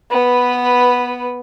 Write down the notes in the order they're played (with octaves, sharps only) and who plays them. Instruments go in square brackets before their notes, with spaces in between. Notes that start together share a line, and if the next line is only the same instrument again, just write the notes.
[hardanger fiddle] B3 B4